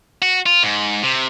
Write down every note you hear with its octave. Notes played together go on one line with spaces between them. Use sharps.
F#4
F4
G#2
C3